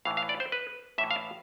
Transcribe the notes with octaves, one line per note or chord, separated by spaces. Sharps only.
A2 E3 F5
F5
D5
C5
B4
A2 E3 E5
F5